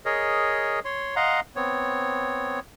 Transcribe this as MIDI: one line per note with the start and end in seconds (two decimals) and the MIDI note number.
0.05 0.80 68
0.05 0.80 70
0.05 0.80 73
0.05 0.80 75
0.85 1.16 73
0.85 1.16 84
1.16 1.40 75
1.16 1.40 77
1.16 1.40 78
1.16 1.40 82
1.16 1.40 84
1.56 2.60 59
1.56 2.60 60
1.56 2.60 73